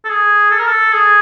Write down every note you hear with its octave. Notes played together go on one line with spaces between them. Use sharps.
A4
G#4
A4
A#4
A4
G#4